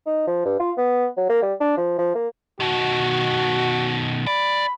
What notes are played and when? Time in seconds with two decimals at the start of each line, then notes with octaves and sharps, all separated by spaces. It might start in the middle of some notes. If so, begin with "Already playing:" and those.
0.06 D#4
0.27 F3
0.45 G2
0.59 F4
0.77 B3
1.17 F#3
1.29 A#3
1.42 G3
1.60 D4
1.77 F3
1.98 F3
2.15 A#3
2.60 B2 D#3 F#4
4.27 D5 B5